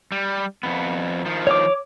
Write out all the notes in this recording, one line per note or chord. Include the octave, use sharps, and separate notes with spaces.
G3
F2 B3
D#3 F3
C#5 D6